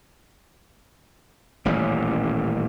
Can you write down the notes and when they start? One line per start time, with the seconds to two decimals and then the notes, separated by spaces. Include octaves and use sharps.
1.65 D#1 A1 G3